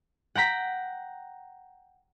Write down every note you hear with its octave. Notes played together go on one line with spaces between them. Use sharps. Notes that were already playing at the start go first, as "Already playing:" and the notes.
F#5 G5 A#5 B6